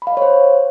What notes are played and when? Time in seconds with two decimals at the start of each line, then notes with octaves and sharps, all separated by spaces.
0.02 B5
0.07 F5
0.12 D#5
0.17 C#5
0.22 C5